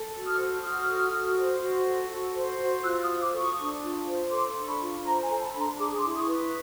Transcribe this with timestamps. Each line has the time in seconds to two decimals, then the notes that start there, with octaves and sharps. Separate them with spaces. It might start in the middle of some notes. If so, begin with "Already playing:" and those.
Already playing: A4
0.14 F#4
0.26 D#6 F6
0.38 C5
0.62 F#4 D#6 F6
0.87 A4
1.11 F#4
1.36 C5
1.60 F#4
1.86 A4
2.10 F#4
2.35 C5
2.60 F#4
2.83 F4 E6 F#6
3.02 D#6 F6
3.08 C5
3.21 D6 E6
3.33 A4
3.38 C#6 D#6
3.58 D4
3.81 F4
4.06 C5
4.30 A4 C6 D6
4.56 D4
4.68 B5 C#6
4.80 F4
5.04 C5 A#5 C6
5.23 G#5 A#5
5.29 A4
5.41 A5 B5
5.53 D4 B5
5.59 A#5 C6
5.78 G#4 D6
5.89 D#6
5.99 C6 D6
6.03 E4
6.15 C#6 D#6
6.27 B4